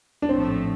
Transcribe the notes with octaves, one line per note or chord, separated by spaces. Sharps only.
D4
A#1 A2 F3 A3 C4